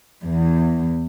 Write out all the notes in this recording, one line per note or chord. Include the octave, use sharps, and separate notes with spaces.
E2